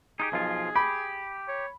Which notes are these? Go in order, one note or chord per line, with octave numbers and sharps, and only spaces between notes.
D#4 F4 G4 G#4
B1 F3 F4
G4 B5
C#5